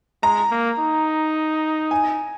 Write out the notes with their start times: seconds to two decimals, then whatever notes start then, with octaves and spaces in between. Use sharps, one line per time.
0.23 G#3 A#5
0.51 A#3
0.79 D#4
1.91 G#5